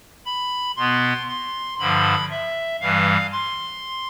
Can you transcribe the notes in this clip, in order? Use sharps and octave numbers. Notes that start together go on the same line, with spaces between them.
B5
B2 B3 C6
C6
G2 D3 F3 B5
E5
G2 E3 G3 F5
C6